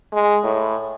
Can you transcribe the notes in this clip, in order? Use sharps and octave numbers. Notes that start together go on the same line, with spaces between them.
G#3
A2